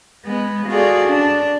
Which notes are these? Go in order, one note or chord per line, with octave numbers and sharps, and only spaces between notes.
G#3 B3
F4 F#4 G#4 A4 D5
D4